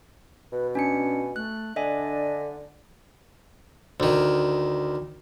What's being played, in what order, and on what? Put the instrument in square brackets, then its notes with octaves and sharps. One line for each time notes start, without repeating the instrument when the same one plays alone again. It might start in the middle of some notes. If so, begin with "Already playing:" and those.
[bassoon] B2 [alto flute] B4
[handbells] C#4 D4 C#7 [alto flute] G#5
[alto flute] A3 [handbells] F#6
[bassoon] D3 [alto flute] D4 [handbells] D#5 E5 G#5
[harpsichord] D2 D#3